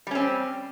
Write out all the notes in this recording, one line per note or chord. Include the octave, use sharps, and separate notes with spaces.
G3 C4 C#4